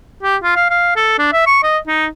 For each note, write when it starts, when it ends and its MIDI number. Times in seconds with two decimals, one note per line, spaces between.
0.23 0.37 67
0.43 0.55 65
0.56 0.68 77
0.70 0.95 77
0.96 1.16 69
1.18 1.31 62
1.33 1.43 76
1.47 1.59 85
1.63 1.78 75
1.87 2.07 63